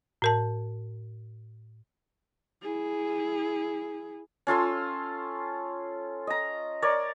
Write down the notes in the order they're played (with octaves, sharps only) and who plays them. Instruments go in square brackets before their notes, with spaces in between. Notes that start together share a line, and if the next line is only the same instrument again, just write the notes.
[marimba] A2 A#4 A5
[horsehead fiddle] E4 G#4
[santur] C#4 F4 A4 C6
D#5 A#5
A#4 C#5 D5